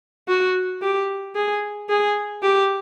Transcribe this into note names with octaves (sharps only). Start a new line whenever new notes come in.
F#4
G4
G#4
G#4
G4